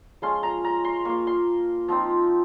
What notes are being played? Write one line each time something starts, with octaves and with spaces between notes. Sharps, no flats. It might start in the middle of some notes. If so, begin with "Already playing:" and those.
F3 G#3 C#4 F4 C6
A#5
A#5
C6
A#3 F4 C#6
C6
F3 C4 D#4